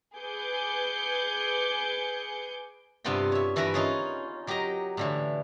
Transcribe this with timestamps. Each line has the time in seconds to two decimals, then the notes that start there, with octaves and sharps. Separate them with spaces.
0.16 G#4 B4 G#5 D6 G6 C#7
3.04 G2 C3 B3 F4 B4 G5
3.32 C#5 E5
3.56 G2 E3 E4 A#4 B4 A#5
3.74 C#4 D#4 F4 G#4 C#5
4.47 F#3 G4 A#4 D#5 A#5
4.97 A2 D3 E3